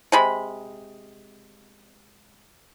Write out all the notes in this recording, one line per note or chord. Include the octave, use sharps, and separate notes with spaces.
C3 G#3 B5